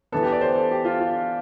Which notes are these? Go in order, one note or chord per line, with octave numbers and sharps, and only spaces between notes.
E3 B3 A4
G4
D5
C5
A4
G4
F4
F4